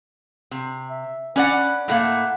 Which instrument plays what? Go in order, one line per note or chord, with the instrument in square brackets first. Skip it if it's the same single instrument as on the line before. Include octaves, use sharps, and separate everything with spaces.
[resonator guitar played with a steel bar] C3
[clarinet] E5
[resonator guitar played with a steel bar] C#4 D5 F#5 [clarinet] B4
[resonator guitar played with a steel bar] A2 A3 A#3 [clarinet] F#5